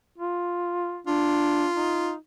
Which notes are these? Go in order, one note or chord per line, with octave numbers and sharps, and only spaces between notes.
F4
D4 F4
D#4